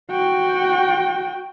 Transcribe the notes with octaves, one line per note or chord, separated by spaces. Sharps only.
F#4 G5